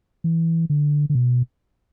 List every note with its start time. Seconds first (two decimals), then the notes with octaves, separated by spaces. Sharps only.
0.24 E3
0.70 D3
1.10 D3
1.15 B2